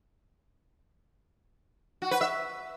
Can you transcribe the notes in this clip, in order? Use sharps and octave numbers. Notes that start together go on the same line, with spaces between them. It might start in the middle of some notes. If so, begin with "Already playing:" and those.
F#4
B4
E5